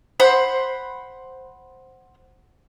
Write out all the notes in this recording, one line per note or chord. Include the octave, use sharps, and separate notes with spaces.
C5 F#5 B5